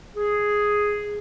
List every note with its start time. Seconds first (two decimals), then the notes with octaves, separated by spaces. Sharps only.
0.17 G#4